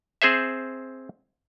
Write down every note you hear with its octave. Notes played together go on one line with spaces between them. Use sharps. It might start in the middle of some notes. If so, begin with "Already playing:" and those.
C4 G#4 C5 E5